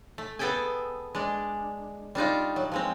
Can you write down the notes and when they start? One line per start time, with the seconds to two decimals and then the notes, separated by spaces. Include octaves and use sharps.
0.18 A3
0.39 B3 G#4 A4 E5 G5 G#5
1.15 G#3 D4
2.15 G3 D4 D#4 F4
2.56 F#3
2.72 F3 G#3 C4